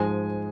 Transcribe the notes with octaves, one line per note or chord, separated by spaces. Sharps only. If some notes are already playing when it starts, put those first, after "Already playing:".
Already playing: G#2 F3 G#3 G#5